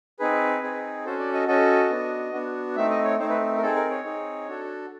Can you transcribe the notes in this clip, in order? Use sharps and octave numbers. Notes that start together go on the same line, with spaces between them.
C4 D#4 G#4 B4
C4 D#4 G#4
C#4 F#4 A4 C5
D5
D#5
C#4 F#4 A4 D#5
B3 D4 F#4
B3 D4 F#4
A3 C4 D#4 E5
D#5
C#5
A3 C4 D#4 C5
B4
A#4
C4 D#4 G#4 A4
A#4
C#5
C4 D#4 G#4
D4 F#4 A4